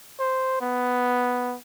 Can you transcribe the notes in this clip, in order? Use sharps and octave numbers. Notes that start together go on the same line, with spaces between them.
C5
B3